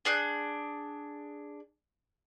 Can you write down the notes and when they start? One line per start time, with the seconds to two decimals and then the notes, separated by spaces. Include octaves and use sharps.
0.05 D4 G#4 F#6 G6